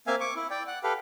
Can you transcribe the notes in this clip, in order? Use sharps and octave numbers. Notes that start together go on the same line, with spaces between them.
A#3 C4 E5 F5 G#5
C#6 D6
E4
D5 G5
F#5
G4 A4 B4 F5